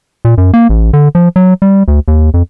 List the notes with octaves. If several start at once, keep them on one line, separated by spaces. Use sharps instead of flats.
A#2
F#2
A#3
A1
D3
F3
F#3
G3
D2
D#2
F2